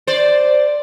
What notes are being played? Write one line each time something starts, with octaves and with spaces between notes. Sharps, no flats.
C5 D5